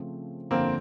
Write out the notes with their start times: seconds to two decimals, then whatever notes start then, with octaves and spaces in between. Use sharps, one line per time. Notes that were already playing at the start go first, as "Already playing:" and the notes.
Already playing: C#3 F3 A3 C4
0.50 G1 F2 D3 F3 A#3 C4